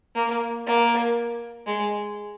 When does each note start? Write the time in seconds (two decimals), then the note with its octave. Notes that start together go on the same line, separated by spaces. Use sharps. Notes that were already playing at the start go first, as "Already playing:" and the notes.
0.15 A#3
0.66 A#3
1.67 G#3